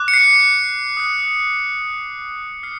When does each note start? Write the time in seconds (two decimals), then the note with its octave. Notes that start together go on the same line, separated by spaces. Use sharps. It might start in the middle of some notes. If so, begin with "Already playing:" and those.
Already playing: D6 F#6
0.08 C#7
0.14 C7
0.97 D#6 F#6
2.63 F6 C7